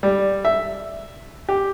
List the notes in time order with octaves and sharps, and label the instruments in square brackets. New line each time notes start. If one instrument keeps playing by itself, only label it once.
[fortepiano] G3
E5
G4